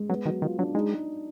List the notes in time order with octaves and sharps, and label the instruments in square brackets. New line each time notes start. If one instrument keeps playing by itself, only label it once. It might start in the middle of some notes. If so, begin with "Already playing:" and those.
Already playing: [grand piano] G#3
[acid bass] F#3 [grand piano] B3
[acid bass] D#3 [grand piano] F#3
[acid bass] D#3 [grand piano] F4
[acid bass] F#3 [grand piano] D4
[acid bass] G#3 [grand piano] D#4